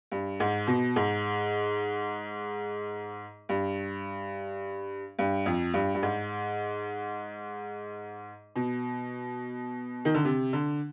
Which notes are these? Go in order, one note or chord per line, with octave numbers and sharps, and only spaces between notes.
G2
G#2
B2
G#2
G2
G2
F2
G2
G2
G#2
B2
D#3
D3
C3
D3